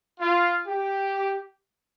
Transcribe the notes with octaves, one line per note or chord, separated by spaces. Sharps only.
F4
G4